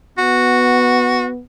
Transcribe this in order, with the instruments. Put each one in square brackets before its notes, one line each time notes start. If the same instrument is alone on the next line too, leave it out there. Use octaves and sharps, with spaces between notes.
[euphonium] B3 [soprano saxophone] F#4